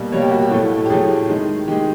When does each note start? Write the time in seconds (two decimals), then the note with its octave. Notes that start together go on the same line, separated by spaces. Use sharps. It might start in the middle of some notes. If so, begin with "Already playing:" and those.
Already playing: B2 G3 A#3
0.12 B2 G3 A#3 C#5
0.22 G4
0.31 F#4
0.42 G4
0.51 A2 F#3 A3
0.86 G4
0.90 A2 F#3 A3 G#4
1.29 D#3 G#3
1.68 D#3 G#3 G4